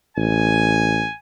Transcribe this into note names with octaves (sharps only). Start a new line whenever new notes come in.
A1 G#5